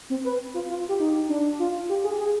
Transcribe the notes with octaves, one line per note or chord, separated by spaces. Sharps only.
C4
B4
F4
F4
G4
D#4
D4
F4
G4
G#4
G#4